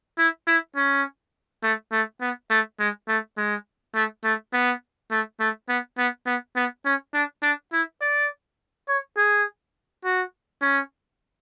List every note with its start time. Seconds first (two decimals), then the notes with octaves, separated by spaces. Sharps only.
0.18 E4
0.47 E4
0.76 C#4
1.63 A3
1.92 A3
2.21 B3
2.50 A3
2.80 G#3
3.08 A3
3.37 G#3
3.95 A3
4.24 A3
4.53 B3
5.11 A3
5.40 A3
5.69 B3
5.98 B3
6.27 B3
6.56 B3
6.85 C#4
7.14 D4
7.43 D4
7.72 E4
8.01 D5
8.89 C#5
9.17 G#4
10.04 F#4
10.62 C#4